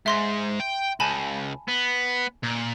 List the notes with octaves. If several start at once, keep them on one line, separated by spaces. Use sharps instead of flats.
G#2 E5 C6 A#6
G5
C#2 G#5 A5 B5
B3
A#2